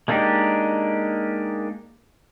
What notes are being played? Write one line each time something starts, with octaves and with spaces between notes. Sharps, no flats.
G#3 A#3 D4 D#4 G4